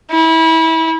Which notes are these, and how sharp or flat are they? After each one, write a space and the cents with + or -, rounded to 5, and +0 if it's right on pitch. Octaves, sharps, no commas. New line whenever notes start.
E4 -25